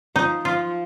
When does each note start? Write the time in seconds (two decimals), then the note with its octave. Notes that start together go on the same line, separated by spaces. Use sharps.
0.16 F3 D#4
0.45 F3 F4